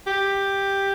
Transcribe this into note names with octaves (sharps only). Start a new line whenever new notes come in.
G4